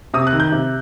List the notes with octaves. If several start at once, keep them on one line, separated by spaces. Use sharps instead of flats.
C3 D#6
F#6
D#3
G6
C3